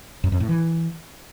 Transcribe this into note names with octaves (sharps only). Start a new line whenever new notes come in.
F#2
F2
A2
E3